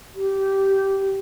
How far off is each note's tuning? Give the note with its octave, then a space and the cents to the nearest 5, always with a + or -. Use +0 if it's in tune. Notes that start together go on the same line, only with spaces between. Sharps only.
G4 -15